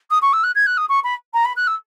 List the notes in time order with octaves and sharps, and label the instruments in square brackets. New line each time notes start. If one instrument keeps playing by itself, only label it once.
[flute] D#6
C#6
E6
F#6
G#6
F#6
D#6
C#6
B5
A#5
B5
F#6
E6